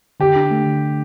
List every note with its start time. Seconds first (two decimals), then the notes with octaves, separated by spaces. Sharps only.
0.20 D3 G4
0.36 D4
0.51 A3
0.66 D3